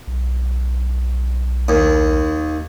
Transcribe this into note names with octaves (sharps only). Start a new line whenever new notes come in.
B1
D#2